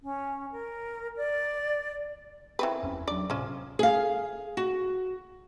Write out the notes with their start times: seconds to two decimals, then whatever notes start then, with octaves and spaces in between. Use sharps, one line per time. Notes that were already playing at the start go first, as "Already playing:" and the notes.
0.02 C#4
0.52 A#4
1.17 D5
2.59 E3 C4 B4
2.82 F#1 E2 C#4
3.08 F#3 D4 D5
3.30 D1 A2 C3 F3 C#4
3.79 G#4 F5
4.57 F#4